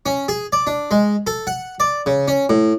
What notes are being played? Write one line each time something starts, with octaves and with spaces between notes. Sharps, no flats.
C#4
G#4
D5
D4
G#3
A4
F#5
D5
C#3
C#4
A2